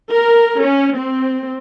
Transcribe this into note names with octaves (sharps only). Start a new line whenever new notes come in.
A#4
C#4
C4